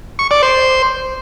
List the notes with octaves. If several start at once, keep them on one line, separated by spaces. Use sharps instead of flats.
C#6
D5
C5